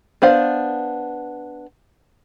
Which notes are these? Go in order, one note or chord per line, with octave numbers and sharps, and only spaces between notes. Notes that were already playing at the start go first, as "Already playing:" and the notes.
B3 D4 C5 F5